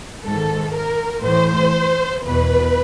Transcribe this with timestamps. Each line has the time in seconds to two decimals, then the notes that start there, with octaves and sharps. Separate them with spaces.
0.25 G#2 D#3 A4
0.74 A#4
1.24 A2 E3 C5
2.24 E2 B2 B4